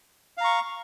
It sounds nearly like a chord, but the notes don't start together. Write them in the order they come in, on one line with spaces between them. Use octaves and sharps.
F5 A#5 C#6